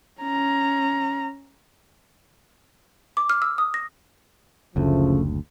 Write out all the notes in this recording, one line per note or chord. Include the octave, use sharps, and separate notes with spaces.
C#4 A#5
D6
F6
E6
D#6
A#6
F#1 D2 C#3 F3 A3